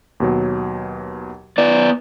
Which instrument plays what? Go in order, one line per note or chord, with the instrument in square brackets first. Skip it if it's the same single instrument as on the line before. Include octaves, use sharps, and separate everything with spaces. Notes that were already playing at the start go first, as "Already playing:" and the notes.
[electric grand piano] D#2 B2 F#3
[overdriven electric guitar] B3 D5